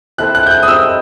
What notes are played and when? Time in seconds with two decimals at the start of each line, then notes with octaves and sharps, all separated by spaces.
0.18 C4 E4 A4 E5 F#6
0.35 F#6
0.47 G6
0.51 F#6
0.63 D#6
0.67 C4 D#4 G4 B4 E6